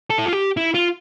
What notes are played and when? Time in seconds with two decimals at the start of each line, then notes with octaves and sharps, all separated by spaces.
0.10 A4
0.19 E4
0.26 F4
0.33 G4
0.57 E4
0.74 F4